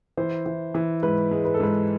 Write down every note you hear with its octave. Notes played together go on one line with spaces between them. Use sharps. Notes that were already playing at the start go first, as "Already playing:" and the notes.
E3 C5
E3
E3
G#2 B4
G#3
B4
A4
G#2 B4